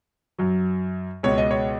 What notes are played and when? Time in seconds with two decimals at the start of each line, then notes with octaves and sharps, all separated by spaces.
0.39 F#2 F#3
1.23 C#2 B2 G#3 C#5
1.38 D#5
1.51 C#5